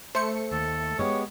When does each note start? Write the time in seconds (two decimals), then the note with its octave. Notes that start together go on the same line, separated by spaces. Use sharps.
0.15 A3 C5 C#7
0.51 D#2 A4
0.99 G#3 B3 G4 C#5